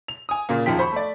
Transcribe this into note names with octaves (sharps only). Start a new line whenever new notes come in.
F7
G#5 D#6
A#2 C#3 A#3
E1 F#2 D#3 F3 G5 B6
C5 B5 C#6
A3 D5